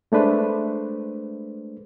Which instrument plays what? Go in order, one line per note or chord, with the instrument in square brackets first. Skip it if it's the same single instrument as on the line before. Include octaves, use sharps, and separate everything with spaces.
[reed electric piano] G#3 A3 D4 B4 C5